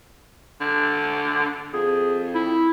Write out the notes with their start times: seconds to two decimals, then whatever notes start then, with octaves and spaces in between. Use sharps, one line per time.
0.60 D3
1.73 F2 G#4
2.35 E4